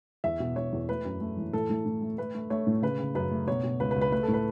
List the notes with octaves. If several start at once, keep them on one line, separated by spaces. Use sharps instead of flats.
E2 E5
B2
B2 C#5
E2
A3 B4
F#2
A3
E3
A2 A4
A2
A2
A3
A3 B4
A3
A3 C#5
A2
C#3 B4
C#3
F#2 B4
A3
B2 C#5
B2
C#2 B4
B4
C#2
B4
A3 B4
A4
A2
B4